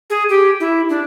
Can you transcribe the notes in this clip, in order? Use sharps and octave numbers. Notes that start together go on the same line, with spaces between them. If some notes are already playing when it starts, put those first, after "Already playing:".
G#4
G4
E4
D4